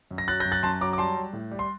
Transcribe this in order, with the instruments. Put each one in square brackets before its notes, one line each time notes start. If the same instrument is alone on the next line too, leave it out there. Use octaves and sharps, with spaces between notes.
[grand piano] F#2
A#6
F#3 F#6 A6
G6 A#6
F#2
F#6 A6
F#2 A5 C6
F#3 A#5 D6
D6
G3 A5 C6
G3
A2
G3
C6